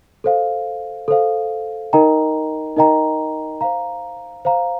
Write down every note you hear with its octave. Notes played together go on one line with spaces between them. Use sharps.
A4 C5 F5
A4 C5 F5
D#4 A#4 D#5 G5 A#5
D#4 A#4 D#5 G5 A#5
C5 F5 A#5
C5 F5 A#5